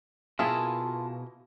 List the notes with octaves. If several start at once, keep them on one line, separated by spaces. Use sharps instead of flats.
B2 A#3 E4 F4 G#4 A5